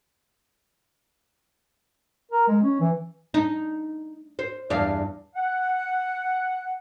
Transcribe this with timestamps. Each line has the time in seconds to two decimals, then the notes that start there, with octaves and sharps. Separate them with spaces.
2.31 A#4
2.48 G#3
2.63 C#4
2.80 E3
3.34 D#4
4.39 C5
4.70 E2 G2 F5
5.35 F#5